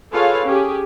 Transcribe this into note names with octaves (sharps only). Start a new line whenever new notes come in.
F4 G#4 A4 B4 C#5 F5
C#4 G4 G#4